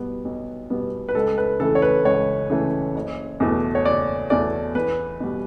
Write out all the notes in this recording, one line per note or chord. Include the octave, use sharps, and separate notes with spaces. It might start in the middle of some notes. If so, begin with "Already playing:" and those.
Already playing: B2 G3 B3
B1
B2 G3 B3
B4
C#2 A4
B4
C#3 E3 A3 A4
C#5
B4
C#2 C#5
C#3 E3 A3
F#1
E2 B2 A3
C#5
F#1 D5
E2 B2 A3 D5
E2 B4
B2 G3